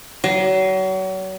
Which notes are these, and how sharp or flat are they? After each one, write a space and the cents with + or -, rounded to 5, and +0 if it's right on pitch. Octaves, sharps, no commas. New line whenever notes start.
F#3 +35